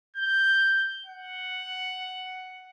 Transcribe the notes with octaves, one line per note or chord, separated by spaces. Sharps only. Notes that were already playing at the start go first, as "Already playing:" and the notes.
G6
F#5